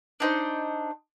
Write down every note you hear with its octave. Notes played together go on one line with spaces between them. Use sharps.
D4 D#4 C5